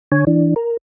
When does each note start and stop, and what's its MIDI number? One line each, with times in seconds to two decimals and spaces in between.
0.12 0.25 50
0.12 0.25 73
0.12 0.25 80
0.27 0.54 52
0.27 0.54 62
0.56 0.77 70